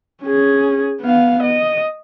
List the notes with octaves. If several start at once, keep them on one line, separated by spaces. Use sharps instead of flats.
C#4 G#4
B3 F5
D#5